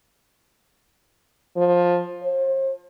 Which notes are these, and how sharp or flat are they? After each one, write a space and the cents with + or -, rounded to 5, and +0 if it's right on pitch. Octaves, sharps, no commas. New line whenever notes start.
F3 +15
C5 +40